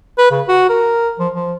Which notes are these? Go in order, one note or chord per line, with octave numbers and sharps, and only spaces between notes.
B4
C#3
F#4
A#4
F3
F3